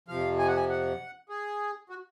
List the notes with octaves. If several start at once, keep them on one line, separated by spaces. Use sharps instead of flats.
F2 C3 F3 F5
G#5
F#5
G#5
F#5
G#4
F#4